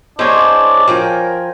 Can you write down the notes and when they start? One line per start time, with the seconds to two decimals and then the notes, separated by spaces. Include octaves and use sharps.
0.19 G#3 D4 E4 C5 C#5
0.88 F3 A#4 G5 G#5